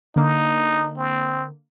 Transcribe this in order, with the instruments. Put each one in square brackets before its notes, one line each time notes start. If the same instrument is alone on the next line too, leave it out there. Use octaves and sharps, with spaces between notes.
[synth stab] D3 A#3 [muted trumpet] D#4
[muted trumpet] C4